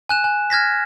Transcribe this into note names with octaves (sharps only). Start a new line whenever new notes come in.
G#5 F#6 E7
G#5
F6 G#6 A#6 B6